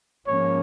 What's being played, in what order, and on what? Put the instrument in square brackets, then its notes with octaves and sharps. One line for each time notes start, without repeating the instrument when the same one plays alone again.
[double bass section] G#2 F3 A#3 C#4 [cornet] C#5